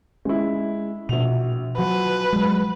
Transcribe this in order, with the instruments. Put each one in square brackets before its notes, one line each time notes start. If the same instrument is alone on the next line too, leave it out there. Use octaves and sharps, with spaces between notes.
[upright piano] G#3 E4 [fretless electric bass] C#4
[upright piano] A#1 F#4 F7 [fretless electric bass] B2
[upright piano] F3 F#4 [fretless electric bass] F#3 [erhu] B4
[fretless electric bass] F#3 G#3